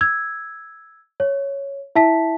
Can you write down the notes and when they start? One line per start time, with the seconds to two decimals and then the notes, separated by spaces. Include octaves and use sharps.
0.01 E6 G#6
1.20 C#5
1.95 E4 E5 A5 B6